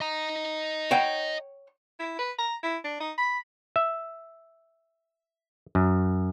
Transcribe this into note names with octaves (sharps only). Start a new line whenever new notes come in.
D#5 A#5
C#5 F#5 G5
E4
B4
A#5
E4
D4
D#4
B5
E5
F#2